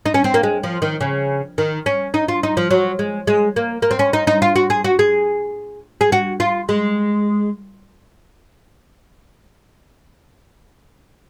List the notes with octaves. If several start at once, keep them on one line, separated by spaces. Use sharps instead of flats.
D#4
C#4
C4
A#3
G#3
F3
D#3
C#3
D#3
C#4
D#4
F4
D#4
F3
F#3
G#3
G#3
A#3
A#3
C4
C#4
D#4
D#4
F4
F#4
G#4
F#4
G#4
G#4
F#4
F4
G#3